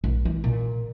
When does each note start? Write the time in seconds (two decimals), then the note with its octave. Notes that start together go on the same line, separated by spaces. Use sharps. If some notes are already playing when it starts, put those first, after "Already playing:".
0.04 A#1
0.25 E3
0.44 A#2